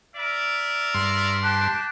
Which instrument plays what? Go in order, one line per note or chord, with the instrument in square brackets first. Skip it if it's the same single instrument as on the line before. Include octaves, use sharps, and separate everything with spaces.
[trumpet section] A#4 D5 E5
[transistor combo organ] G2 C6
[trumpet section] D4 G4 [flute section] A5 F#6